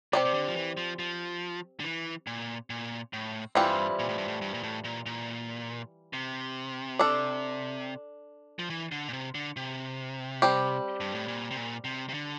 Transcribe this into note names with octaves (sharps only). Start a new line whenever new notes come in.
C3 C4 G4 D5
C3
D3
F3
E3
F3
F3
D3
E3
A#2
A#2
A2
G2 E3 G3 C4 F4
A#2
A2
G2
A2
G2
A#2
A2
A#2
A#2
C3
D4 A4 D5
F3
E3
D3
A#2
C3
D3
C3
G3 C4 G4
G2
A2
A#2
C3
A#2
C3
C3
D3